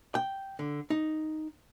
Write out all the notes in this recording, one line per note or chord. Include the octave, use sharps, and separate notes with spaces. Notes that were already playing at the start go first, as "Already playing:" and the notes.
G5
D3
D#4